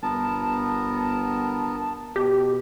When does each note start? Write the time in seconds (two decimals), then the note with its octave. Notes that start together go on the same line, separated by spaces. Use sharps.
0.03 G1 B3 A#4 A5
2.16 B2 G4